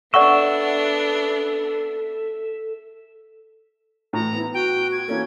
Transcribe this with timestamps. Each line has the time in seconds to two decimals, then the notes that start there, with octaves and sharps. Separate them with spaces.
0.14 B3 D4 A4 D5 E5 F#5 C#6
4.13 A2 E3 A#5
4.33 B3 E4
4.54 F#4 G5
4.92 G#6
5.08 E3 A#3 C#4 A4